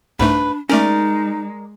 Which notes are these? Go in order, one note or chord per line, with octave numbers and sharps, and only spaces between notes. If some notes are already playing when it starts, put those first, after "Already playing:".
C2 G#2 A3 D4 B4
G#3 A3 C#4 D#4 A#4 D5